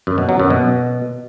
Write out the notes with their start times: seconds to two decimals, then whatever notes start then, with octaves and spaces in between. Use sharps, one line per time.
0.07 F#2
0.18 B2
0.29 F#3
0.40 F#2
0.50 B2